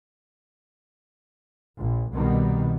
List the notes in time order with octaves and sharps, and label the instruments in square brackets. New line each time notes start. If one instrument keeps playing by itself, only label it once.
[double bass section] A#1
C2 B2 D#3 G3 B3